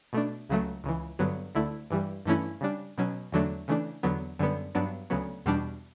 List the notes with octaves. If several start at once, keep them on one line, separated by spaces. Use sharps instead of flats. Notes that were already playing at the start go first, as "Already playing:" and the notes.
B2 A3 D4
C#2 C#3 F#3 A3
C#2 C#3 E3
G2 D3 F#3 B3
D2 D3 A3 E4
G2 E3 G3
G2 E3 A3 C#4 E4
C#3 G3 D4
B2 F#3 C#4
E2 D3 F#3 A3 D4
C#3 E3 A3 D4
E2 D3 F#3 B3
F#2 D3 G3 B3
G2 F#3 B3 D4
D2 C#3 F#3 B3
E2 B2 G3 D4